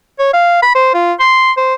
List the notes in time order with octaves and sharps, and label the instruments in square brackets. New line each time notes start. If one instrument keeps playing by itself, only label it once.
[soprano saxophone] C#5
F5
B5
C5
F4
C6
C5